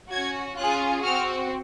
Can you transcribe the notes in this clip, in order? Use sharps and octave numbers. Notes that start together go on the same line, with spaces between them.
C#4 F#4 G#6
C#4 F4 G#4 F#6
C4 F#4 F6